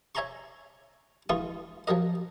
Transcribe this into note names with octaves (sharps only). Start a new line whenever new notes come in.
C#5 E5 G#5 A#5 C6 C#6
C#2 E3 F4 C#6 D#6
F3 F#3 A#4 D#5